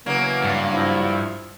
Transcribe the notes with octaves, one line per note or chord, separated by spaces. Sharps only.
C#3 E3 F#3 A#3 B3
G2
F3 E4